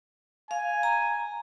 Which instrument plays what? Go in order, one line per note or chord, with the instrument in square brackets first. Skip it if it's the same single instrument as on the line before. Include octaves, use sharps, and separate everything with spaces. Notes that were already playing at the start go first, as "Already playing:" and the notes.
[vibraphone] F5 [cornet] G#5
[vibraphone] A#5